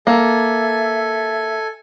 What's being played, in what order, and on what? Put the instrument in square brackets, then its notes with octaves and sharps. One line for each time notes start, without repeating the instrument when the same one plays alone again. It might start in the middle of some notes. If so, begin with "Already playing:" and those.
[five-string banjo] A#3 [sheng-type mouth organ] A4 G#5 [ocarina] E5